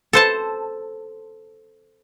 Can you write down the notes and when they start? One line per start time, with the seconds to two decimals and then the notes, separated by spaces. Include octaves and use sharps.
0.13 A4 C5 A5